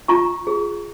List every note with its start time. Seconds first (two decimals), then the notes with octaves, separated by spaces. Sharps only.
0.08 F4 A#5 C#6
0.47 G#4